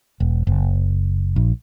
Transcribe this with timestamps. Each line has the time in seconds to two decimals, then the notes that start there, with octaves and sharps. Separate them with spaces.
0.20 E1
0.47 F#1
1.36 A#1